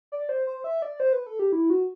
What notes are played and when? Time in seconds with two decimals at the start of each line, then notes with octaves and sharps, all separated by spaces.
0.12 D5
0.29 C5
0.47 C5
0.64 E5
0.82 D5
1.00 C5
1.13 B4
1.26 A4
1.39 G4
1.52 E4
1.70 F#4